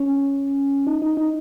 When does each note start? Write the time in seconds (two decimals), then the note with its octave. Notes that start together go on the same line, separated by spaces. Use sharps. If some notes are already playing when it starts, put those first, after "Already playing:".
Already playing: C#4
0.87 D#4
1.02 D#4
1.17 D#4